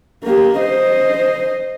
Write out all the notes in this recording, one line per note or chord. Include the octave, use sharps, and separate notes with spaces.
A#3 G4
C5 D#5